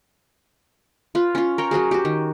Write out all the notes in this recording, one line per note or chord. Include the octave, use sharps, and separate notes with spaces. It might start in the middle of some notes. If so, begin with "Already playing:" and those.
F4 B4
C#4 F4
A#4 C#5 G5
F#3 C#4 F#4 G#4
F#4 G4
D#3